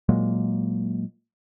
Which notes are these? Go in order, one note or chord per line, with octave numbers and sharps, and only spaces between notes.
A#2 F#3 G#3 A#3